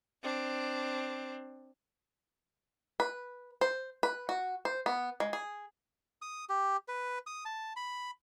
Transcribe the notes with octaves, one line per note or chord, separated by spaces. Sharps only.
C4 D4
B4
C5
B4
F#4
C5
B3
G#3
G#4
D#6
G4
B4
D#6
A5
B5